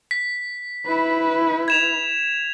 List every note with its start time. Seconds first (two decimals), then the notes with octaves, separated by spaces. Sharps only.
0.11 B6
0.86 E4 B4
1.68 G#6 E7 F7